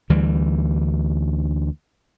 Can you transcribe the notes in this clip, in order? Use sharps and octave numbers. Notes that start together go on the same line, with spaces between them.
D2 E3 G3